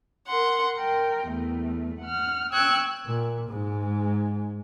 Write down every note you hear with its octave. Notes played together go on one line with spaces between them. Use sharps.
A#4 F#5 C6
A#4 G5
E2 A3
F#5 F6
G5 C#6 E6 F#6 G#6
A#2
G#2 G#3